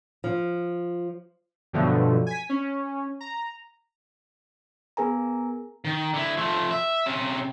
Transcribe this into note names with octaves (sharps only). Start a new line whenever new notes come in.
F3
G2 B2 D3 F3 F#3 A3
G#5 B6
C#4
A#5
B3 G#4 A#4 G#5 A#5
D#3
D3 E4
F3 A3
E5
C3 C#4